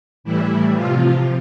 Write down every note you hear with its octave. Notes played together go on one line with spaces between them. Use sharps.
A2 E3 G3 E4
C3 F3 F4